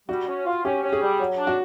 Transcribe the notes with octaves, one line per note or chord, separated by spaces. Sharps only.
G3 F#4
C#4
F4
C#4 G4
C#4
G#4
G3
F#3
D4
F#4